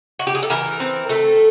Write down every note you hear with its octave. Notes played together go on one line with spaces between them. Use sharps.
F#4
G4
G#4
A4
E3 A#4
C4
A3 A4